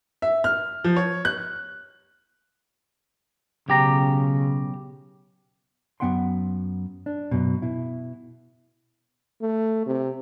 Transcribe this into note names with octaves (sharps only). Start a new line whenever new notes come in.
E5
F6
F3
C#5
F#6
B1 C#3 G4 A#5
F#2 G#3 B3 F#5 G5 C6
D4
F#2 B2
B2 E4
A3
C3